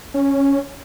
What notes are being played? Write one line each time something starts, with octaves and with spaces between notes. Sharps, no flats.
C#4